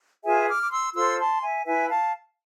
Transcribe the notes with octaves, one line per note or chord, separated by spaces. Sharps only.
F4 G#4 B4 E5 G#5
D6 F6
D6
C6 E6
F4 A4 C5 C6 E6
A5 C6
E5 G#5
E4 B4 E5 G#5
F5 A5